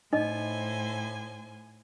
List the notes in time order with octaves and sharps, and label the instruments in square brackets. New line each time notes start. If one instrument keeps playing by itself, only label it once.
[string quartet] A2 C5 G#5 [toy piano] D#4 D#5